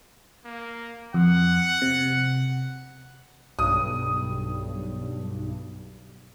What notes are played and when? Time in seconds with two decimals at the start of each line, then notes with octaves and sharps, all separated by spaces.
0.45 A#3
1.14 F2 F#5
1.82 C3
3.59 B1 G2 D#6